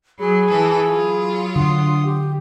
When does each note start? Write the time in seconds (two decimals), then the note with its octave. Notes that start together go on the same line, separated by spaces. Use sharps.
0.19 F#3 G#4 B5
0.48 E3 A4
0.88 F#3 F4
1.56 D3 F#5 C6 D#6
2.06 G4